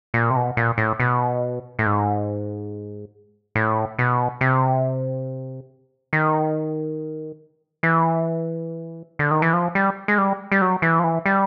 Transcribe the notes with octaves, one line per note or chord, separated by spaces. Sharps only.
A#2
C3
B2
A#2
A2
B2
A2
G#2
A2
B2
C3
D#3
E3
D3
D#3
E3
F3
G3
G#3
G3
G3
F#3
E3
F3
E3
G3